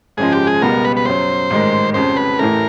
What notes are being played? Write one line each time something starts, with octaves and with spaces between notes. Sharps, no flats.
G#1 F#2 C#3 F3 G#3 G#4
G4
G#4
C#2 B2 G3 B3 A#4
B4
B4
F#2 C#3 F#3 C5
A1 G#2 D#3 G#3
F1 F2 C#3 C5
B4
A1 A2 E3 A3 A#4